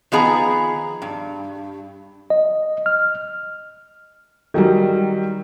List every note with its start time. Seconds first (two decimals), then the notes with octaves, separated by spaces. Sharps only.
0.12 D#3 F3 B3 G#4 A#5
1.02 G2
2.30 D#5
2.86 F6
4.54 D#3 F#3 G3